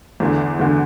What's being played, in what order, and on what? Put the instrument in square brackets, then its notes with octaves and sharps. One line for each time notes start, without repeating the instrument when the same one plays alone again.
[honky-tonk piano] E2 D3
E2 D3